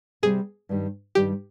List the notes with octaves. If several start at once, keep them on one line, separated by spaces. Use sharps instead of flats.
C3 G3 C4 G#4
G2 D#3 G3
G2 D#3 G3 G4